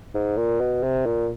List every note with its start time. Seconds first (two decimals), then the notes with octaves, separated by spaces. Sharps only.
0.14 G#2
0.37 A#2
0.60 B2
0.83 C3
1.06 A#2